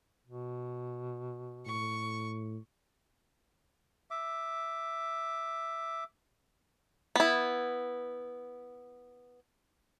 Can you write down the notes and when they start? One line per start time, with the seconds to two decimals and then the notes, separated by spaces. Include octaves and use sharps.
0.27 B2
1.66 A2 C#6
4.11 E5 D6
7.16 B3 E4